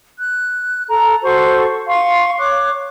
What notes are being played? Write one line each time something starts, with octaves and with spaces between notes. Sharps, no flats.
F#6
A4 A#5
F#4 A4 C5 C#6
F5 C6 C#6
C#5 C#6 D6 F#6